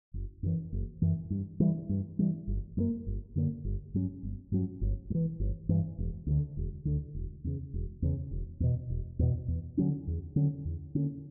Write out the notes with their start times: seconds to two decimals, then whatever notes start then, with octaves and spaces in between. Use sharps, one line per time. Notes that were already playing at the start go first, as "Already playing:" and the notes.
0.14 F#1
0.43 F#2 E3
0.72 F#1
1.02 F#2 E3
1.30 G2
1.60 E3 G3
1.89 G2
2.19 E3 G3
2.47 G1
2.77 F#2 D3 A#3
3.06 G1
3.35 F#2 D3 A#3
3.64 G1
3.94 G2 F#3 C#4
4.23 G1
4.52 G2 F#3 C#4
4.81 G1
5.10 G2
5.14 E3
5.40 G1
5.69 G2 E3
5.98 E1
6.27 D2 D3
6.57 E1
6.85 D2 D3
7.14 E1
7.44 E2 C#3
7.74 E1
8.02 E2 C#3
8.31 E1
8.60 E2 B2
8.90 E1
9.19 E2 B2
9.48 E2
9.77 D3 F#3 C#4
10.07 E2
10.36 D3 F#3 C#4
10.65 E2
10.95 D3 A#3 C#4